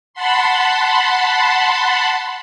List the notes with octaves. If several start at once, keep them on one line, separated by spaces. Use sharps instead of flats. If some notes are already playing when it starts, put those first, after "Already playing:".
F#5 A5 B5 C6